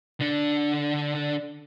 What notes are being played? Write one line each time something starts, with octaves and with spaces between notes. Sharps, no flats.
D3 D4